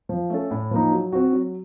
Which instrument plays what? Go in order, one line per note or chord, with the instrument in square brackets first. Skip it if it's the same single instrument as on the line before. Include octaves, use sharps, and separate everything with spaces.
[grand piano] F3
A3 C#4 A4
A2
F3 A#3 D#4
F#3
C4 F#4
F#3